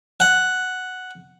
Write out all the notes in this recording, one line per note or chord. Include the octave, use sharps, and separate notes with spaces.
F#5